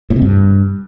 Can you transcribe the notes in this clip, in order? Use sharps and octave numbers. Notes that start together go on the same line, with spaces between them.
A2
C3
G2